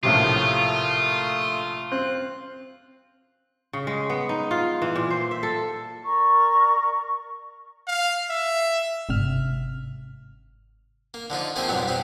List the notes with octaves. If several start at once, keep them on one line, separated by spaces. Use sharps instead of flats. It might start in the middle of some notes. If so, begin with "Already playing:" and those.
A#1 A2 C3 A3 F4 D#6
C4 F#6
C#3
G#3
B3
D#4
F4
E3
A#2
C5
E5
A4
A#4 D5 A#5 C#6
F5
E5
G1 G#2 C3 F6
A#3
D3 F3 D#4 F4
F3 A3 A#3 C4 G#4
F2 G#2 B2 F#3 G3
B2 F3 B3 C4